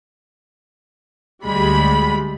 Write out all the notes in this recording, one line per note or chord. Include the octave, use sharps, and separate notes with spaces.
D2 G3 G#3 B5